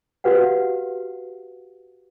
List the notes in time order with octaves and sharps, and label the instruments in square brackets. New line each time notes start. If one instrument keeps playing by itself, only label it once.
[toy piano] F#4 G4 B4 F5 F#5